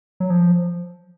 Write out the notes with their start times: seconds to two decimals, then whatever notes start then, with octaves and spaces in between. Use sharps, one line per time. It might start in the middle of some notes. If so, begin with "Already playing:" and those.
0.20 F#3
0.30 F3